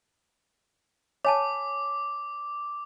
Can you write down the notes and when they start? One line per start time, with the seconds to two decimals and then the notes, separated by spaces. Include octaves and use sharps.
1.25 C#5 G#5 A5 D6